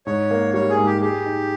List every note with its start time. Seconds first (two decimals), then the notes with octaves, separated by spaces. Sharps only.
0.06 G#2 C#5
0.31 A#3
0.54 G3 C#5
0.70 G#4
0.78 G#2
0.86 G4
1.02 G4 G#4
1.26 D#4